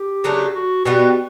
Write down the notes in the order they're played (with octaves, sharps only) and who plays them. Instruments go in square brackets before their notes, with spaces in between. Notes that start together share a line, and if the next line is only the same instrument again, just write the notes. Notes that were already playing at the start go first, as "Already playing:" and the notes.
Already playing: [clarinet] G4
[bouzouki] C#3 F#3 A3 D4
[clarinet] F#4
[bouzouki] B2 G3 B3 [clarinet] F#4